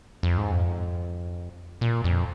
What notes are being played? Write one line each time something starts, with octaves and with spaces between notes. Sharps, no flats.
F2
G#2
F2
A#2
F2